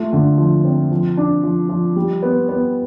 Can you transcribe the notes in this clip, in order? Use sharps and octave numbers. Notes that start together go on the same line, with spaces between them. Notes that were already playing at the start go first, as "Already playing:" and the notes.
Already playing: A3 F4
D3
F3
C4
F3
D4
F3
F3
G3
B3
B3